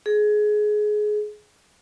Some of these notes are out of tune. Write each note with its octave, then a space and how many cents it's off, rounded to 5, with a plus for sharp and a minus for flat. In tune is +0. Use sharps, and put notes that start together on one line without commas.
G#4 +20